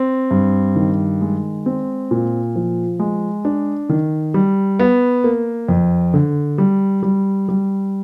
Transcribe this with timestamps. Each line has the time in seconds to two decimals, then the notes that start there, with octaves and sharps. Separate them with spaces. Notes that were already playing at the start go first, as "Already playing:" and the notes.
Already playing: C4
0.31 G2
0.76 D#3
1.21 G#3
1.66 C4
2.11 A#2
2.56 F3
2.99 G#3
3.45 D4
3.89 D#3
4.34 G3
4.79 B3
5.24 A#3
5.69 F2
6.14 D3
6.58 G3
7.03 G3
7.49 G3